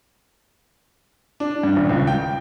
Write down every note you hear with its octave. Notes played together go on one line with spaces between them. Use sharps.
D4
G2
D#1
C#2
G5